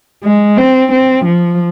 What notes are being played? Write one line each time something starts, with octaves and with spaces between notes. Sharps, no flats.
G#3
C4
C4
F3